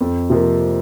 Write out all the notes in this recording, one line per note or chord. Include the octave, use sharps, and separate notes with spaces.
F2
C3 F3 A#3